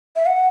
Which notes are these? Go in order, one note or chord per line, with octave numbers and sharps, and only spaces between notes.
E5
F#5